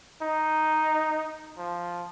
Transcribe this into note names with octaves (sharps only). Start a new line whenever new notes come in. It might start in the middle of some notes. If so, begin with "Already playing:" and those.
D#4
F3